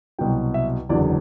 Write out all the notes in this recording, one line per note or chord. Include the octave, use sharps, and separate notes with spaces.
C2 B2 F#3 G5
E5
F#1 E2 D3 F#3 D5